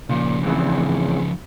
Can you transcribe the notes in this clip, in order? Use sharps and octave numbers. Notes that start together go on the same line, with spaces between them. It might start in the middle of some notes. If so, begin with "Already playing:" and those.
A#2 C#3 F3
G#2 E3 C4